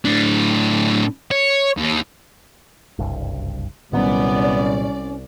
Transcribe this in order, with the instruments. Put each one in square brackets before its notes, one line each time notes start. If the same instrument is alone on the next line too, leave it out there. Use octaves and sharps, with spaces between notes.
[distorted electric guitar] A2 D4
C#5
D#2
[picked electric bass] F#1 C2 G2
[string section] C2 D5 [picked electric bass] A#2 D#3 F#3 [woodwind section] B3 [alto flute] C#4